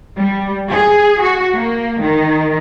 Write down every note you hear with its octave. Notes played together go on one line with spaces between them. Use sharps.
G3
G#4
F#4
A#3
D#3